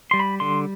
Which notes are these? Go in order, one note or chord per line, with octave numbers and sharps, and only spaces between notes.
G3 C6
B5
D3 C6